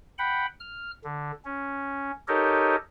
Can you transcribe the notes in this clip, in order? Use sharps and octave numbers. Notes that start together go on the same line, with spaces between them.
F#5 G5 B5
F6
D3
C#4
D#4 G4 A4 A#4 C#5 D#5